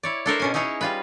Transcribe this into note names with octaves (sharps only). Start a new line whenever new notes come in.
E4 C#5 D5
D4 A4 A#4 C5
B2 C#4 G#5
C#4 D#4 E4 G#4 C#5
G3 F4 B4